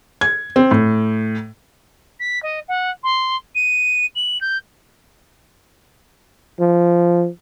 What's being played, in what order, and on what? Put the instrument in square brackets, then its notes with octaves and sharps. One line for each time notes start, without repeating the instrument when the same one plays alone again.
[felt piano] G#6
C4
A2
[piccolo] B6
D#5
F#5
C6
D#7
F#7
G6
[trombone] F3